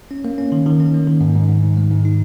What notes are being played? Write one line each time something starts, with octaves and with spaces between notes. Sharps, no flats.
C#4
A#3
C#4
D#3
D#3
C#4
A#3
D#3
G#2
G#2
G#2
G#2
G#3
G#2
D#4